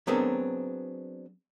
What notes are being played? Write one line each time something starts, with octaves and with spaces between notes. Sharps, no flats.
F#3 B3 C4 D4 G#4 A#4